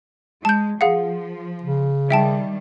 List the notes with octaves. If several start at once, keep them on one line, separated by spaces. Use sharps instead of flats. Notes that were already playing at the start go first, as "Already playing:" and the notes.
G#3 A5 G6
F3 G#4 F5 F#5
C#3
D#3 G3 E5 G5 A5